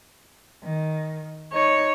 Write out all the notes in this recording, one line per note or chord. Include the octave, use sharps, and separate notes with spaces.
D#3
D#4 C#5